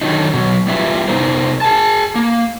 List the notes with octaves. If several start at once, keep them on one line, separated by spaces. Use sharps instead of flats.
D3 D#3 F#3 D#4
B2 F#3
G3 B3 E4 F4 B4 E5
C3 G3 B3 D#4 A#4 C5
G#4 G#5 A5
A#3